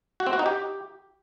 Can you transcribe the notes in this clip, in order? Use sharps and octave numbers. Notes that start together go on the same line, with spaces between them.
F#4
C4
F#4
D#4
G4